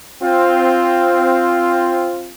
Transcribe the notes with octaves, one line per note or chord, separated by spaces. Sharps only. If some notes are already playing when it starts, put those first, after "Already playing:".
C4 F4